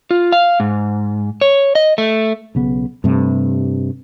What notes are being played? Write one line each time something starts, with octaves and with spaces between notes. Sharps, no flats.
F4
F5
G#2
C#5
D#5
A3
B1 C#3 B3
G2 C3 A3